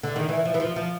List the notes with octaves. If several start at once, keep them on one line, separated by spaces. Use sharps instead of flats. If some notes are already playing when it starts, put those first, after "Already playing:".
D3
D#3
E3
F3
E3
F3
F3